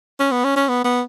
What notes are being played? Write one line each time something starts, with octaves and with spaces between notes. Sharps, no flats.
C#4
B3
C#4
C#4
B3
B3